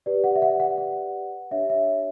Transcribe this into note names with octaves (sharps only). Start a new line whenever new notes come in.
G4 B4 D5
F#5
E5
F#5
F#5
F#5
D4 G4 C#5 E5
E5